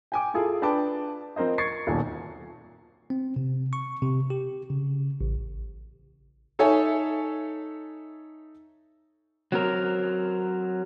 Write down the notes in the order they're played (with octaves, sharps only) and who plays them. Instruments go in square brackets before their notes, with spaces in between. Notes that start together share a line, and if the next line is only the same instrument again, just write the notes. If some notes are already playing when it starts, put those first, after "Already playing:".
[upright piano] G5 G#5 D6
E4 F4 G#4 A4
D4 B4 G5 A5 D6
F3 C4 A#4 C5 D#5
C#6 G#6 A6 C7 C#7
D#1 B1 A#2
[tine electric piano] C4
C3
C#6
C3
G4
C#3
A1
[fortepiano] D#4 A4 C#5 E5 G#5
[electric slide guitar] F#3 C4 A#4